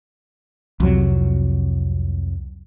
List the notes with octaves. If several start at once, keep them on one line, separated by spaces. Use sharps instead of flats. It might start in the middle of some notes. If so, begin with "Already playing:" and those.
C2 F2 C3 F#3